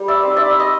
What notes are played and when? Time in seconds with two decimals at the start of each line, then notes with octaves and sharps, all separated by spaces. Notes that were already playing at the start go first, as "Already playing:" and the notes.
Already playing: G3
0.08 D5 E5
0.23 C4 D#4
0.36 D5 E5
0.60 D#5